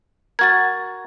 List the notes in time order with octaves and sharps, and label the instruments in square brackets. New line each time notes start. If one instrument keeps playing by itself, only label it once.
[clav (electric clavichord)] F#4 A#4 [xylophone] G#6 A6